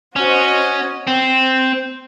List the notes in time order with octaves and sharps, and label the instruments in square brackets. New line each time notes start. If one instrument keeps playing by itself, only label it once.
[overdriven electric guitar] C#4 [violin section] F#4 C5 D#5
[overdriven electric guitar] C4